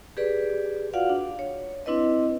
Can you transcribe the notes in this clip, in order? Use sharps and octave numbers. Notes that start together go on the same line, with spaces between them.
G4 G#4 B4 D5
F4 F#4 D5 F5 F#5
D4
C#5
C4 D4 E4 B4 D#5